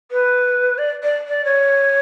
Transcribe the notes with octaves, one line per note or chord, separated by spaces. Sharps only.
B4
D5
D5
D5
C#5